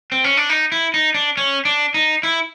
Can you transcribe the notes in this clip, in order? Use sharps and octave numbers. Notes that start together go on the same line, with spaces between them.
C4
C#4
D4
D#4
E4
D#4
D4
C#4
D4
D#4
E4